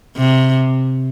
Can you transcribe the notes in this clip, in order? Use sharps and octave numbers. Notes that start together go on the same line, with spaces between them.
C3